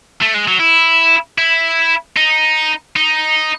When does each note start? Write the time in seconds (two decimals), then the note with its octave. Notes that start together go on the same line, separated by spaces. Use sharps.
0.21 A3
0.34 G#3
0.48 F#3
0.60 E4
1.38 E4
2.17 D#4
2.96 D#4